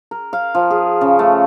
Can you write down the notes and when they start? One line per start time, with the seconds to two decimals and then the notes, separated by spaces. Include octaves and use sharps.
0.11 A#4
0.33 F5
0.55 F3
0.71 G#4
1.01 C#3
1.19 A3